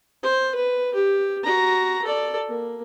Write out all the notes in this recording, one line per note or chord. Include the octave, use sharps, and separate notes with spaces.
C5
B4
G4
F#4 A#5
A4 D5
A#3